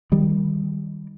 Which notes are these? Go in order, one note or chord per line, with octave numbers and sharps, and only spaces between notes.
D#3 G3